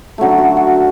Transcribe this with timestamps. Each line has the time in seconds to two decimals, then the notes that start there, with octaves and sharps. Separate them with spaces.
0.18 D3 F#3 A3
0.38 F#4
0.57 F#4